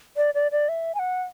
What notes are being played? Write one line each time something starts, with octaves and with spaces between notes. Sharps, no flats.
D5
D5
D5
E5
G#5
F#5